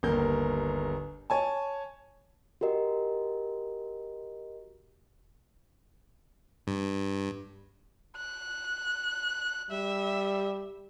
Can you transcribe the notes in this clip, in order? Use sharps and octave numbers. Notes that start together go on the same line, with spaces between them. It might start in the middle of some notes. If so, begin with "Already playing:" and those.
G1 D#2 A#4 G6
C#5 G#5 A5
F#4 G4 A#4 D#5
G2
F#6
G3 E5